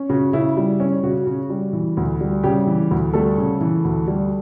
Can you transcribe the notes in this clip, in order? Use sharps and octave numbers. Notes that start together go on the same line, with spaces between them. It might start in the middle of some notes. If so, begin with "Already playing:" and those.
Already playing: C#4
C#3 F#4
C#3 E4
G3
C#4
C#3 F#4
C#3
G3
E3
D2
G3
C#3 G3 G4
E3
D2
G3 A3 A4
C#3
E3
D2
G3